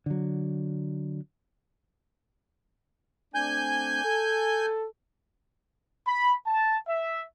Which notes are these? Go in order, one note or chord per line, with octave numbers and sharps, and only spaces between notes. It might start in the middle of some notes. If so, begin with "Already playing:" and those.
D3 F#3
A3 C4 D4 G#5 G6
A4
B5
A5
E5